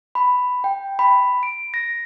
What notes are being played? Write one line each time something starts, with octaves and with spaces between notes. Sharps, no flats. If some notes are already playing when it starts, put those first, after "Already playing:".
B5
G5
B5
D7
A#6